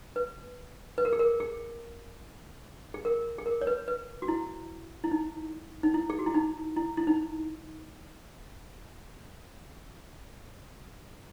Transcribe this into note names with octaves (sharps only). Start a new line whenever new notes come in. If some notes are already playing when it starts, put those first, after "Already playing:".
B4
B4
A#4
G#4
A#4
G#4
G#4
A#4
G#4
A#4
C#5
B4
B4
F#4
E4
E4
D#4
D#4
E4
G#4
F#4
E4
D#4
E4
E4
D#4